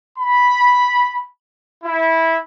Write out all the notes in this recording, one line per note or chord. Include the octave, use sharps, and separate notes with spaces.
B5
E4